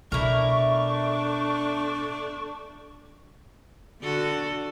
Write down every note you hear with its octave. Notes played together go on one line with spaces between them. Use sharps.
B2 A3 D4 E4 A#4 C#6
D3 F#4 A4